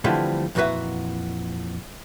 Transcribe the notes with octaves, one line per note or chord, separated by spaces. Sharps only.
D3 E3 F3 G3 A3 C4
F2 A#2 E3 F#4 B4 E5